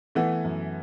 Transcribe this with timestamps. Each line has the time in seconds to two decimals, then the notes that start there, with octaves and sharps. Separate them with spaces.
0.15 E3 A3 B3
0.44 F#2